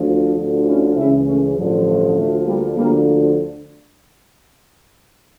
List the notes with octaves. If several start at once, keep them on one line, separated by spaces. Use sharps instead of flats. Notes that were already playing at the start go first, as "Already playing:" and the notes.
Already playing: D2 D3 F3
D2 D3 F3
C#4 E4
C#2 C#3 E3 C#4 E4
A3 C#4
A1 G2 D3 F3
A3
D2 D3 F3 A3
G3 A#3
D2 D3 F3 G3 A#3